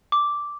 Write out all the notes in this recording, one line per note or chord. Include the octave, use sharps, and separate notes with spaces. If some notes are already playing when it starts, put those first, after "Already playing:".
D6